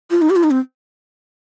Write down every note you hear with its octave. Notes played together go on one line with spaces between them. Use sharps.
F4
D#4
G4
F4
D#4
C4